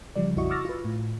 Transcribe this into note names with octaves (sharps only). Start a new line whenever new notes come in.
C#3 F3 G3 D5
A#1 F2 E4 F#4 D#5 C#6
C#6 D6 E6 F6 A6 A#6
F4 B4
A2